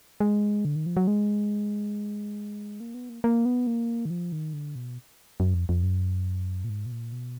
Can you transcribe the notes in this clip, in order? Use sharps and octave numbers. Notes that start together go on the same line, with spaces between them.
G#3
D3
D#3
F3
F#3
G#3
A#3
B3
A#3
A#3
B3
A#3
D#3
F3
D#3
D3
B2
F#2
F2
F2
F#2
A#2
G#2
B2
A#2
B2